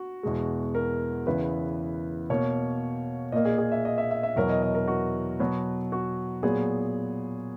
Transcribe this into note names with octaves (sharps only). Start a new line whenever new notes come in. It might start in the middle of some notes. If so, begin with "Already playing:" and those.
Already playing: F#4
E2 B2 G#3
A#4
E2 C#3 E3 B4
B2 A#3 C#5
A#2 A#3 D#5
G#4
G#4
E5
D#5
E5
E5
E5
E2 B2 F#3 A#4
D#5
D#5
A#4
F#4
B2 F#3 B3
F#4
A#2 F#3 B3 G#4